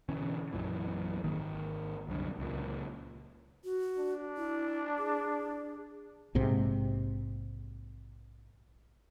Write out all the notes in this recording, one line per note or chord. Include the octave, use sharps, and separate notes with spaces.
B2 D3 E3 C#4
A#1 F#2 A#2 E3
G#1 D#3 A#3
C2 F#2 D3
C#2 A#2
F#4
D4
E4
G#4
A#1 G#2 C3